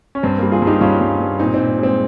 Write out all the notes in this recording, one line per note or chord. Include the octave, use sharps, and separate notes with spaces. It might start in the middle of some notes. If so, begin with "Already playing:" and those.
C#4
G2 C4
G3 A#3
F4 G#4
G2
D#4 G4
G2 C#4 F4
G2
G2
A#2 C4 D#4
C4 D#4
A#2
G#3 C4